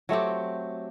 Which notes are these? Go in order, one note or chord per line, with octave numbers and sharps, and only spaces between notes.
F#3 A3 C4 G4